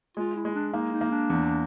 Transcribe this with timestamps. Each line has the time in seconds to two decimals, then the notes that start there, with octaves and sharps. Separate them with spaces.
0.17 G#3 F4
0.36 E4
0.45 G#3
0.55 D4
0.73 A#3 D#4
0.92 D#4
1.01 A#3
1.11 D4
1.30 E2